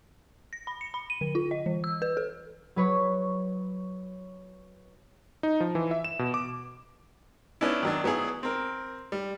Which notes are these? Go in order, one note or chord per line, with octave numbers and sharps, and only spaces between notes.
A#6
B5
C#7
B5
D#7
D3
F4
D#5
E3
E6
B4
A4
F#3 B4 C#5
D#4
F3
E3
E5
E7
B2
D6
B3 C#4 D4 E4
D#3 F#3 D4
F#3 B3 E4 G#4
C4 A#4
G3